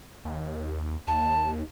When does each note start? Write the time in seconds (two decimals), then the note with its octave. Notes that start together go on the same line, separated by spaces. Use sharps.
0.25 D#2
1.07 D#2 A5